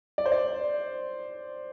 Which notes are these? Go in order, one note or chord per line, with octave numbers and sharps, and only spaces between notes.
D5
C5
D5